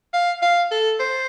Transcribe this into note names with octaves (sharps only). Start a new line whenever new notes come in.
F5
F5
A4
C5